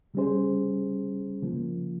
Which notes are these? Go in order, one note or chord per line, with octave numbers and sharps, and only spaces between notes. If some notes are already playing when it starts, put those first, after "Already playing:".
C#3 G3 C#4 G#4 C5
C#3 F3 A#3